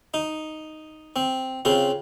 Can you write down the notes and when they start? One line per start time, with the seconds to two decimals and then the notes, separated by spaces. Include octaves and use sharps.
0.14 D#4
1.16 C4
1.65 C#3 C4 F4